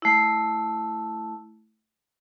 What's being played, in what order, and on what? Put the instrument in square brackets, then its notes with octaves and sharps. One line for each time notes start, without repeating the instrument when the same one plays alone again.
[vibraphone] A3 E4